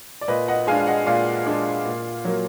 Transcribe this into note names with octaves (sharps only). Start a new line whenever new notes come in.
D5
A#2 B4 D#5
D#5 F#5
G#3 D4 F5 G#5
F5
D#5 F#5
A#2 D5 F5
G#3 D4
A#2
F#3 A#3